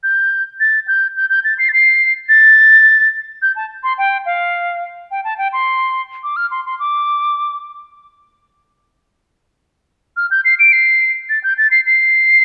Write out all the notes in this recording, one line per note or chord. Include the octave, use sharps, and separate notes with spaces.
G6
A6
G6
G6
G6
A6
C7
A6
C7
A6
G6
A5
C6
G5
F5
G5
A5
G5
C6
D6
F6
C6
C6
D6
F6
G6
C7
D7
C7
A6
G6
A6
C7
C7